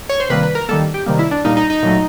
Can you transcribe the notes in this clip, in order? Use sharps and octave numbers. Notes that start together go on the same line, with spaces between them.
C#5
C5
C3 D#3 G3 A#3 B4
B4
A#4
D#3 G3 A#3 A4
G4
C3 D#3 G3 A#3
E4
D4
A#2 G3 A#3 D#4
D#4
D#4
A#2 F#3 A3